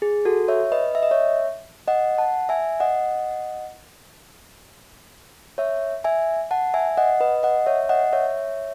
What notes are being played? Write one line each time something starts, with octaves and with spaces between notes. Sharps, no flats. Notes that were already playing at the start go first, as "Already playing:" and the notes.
G#4
F#4 A4
C#5 E5
B4 D#5
E5
D#5
C#5 E5
D#5 F#5
F#5 A5
E5 G#5
D#5 F#5
C#5 E5
E5 G#5
F#5 A5
E5 G#5
D#5 F#5
B4 D#5
D#5 F#5
C#5 E5
D#5 F#5
C#5 E5